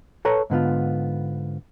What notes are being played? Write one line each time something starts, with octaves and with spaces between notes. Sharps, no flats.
A4 B4 C#5 A5 A#5
G#2 D3 B3 F4